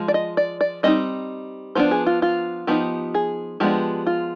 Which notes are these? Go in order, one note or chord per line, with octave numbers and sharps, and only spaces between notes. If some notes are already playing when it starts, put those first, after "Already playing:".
Already playing: F3 G#3
D5
D#5
D5
D5
G3 C4 D#4 D#5
F3 B3 D4 C5
G#4
F4
F4
F3 B3 D#4 G4
G#4
F3 G#3 B3 D4 G4
F4